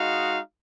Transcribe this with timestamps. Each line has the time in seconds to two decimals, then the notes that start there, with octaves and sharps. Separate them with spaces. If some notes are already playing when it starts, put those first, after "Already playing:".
Already playing: G#3 D#4 F#4 F5